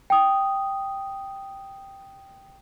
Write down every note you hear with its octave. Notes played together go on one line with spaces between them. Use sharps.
G5 D#6